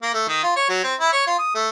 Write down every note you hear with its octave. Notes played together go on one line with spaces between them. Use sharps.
A#3
A3
D#3
F4
C#5
F#3
C4
E4
C#5
F4
D#6
A3